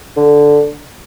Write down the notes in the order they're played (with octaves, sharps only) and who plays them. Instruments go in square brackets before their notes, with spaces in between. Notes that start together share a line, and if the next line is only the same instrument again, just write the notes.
[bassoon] D3